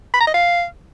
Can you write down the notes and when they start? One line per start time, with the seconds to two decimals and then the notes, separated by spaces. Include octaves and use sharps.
0.14 B5
0.20 A#5
0.27 D#5
0.34 F5